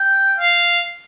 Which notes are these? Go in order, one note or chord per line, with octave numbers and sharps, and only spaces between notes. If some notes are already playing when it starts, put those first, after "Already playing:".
Already playing: G5
F5